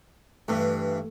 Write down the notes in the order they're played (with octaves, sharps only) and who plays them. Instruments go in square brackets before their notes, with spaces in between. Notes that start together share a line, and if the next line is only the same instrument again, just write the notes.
[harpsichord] G2 E3 [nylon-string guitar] A3